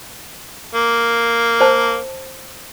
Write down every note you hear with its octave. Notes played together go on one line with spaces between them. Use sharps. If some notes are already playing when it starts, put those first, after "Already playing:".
A#3
C5 A5